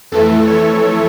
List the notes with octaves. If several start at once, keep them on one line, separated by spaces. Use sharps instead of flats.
F2 E3 A3 A4
C#5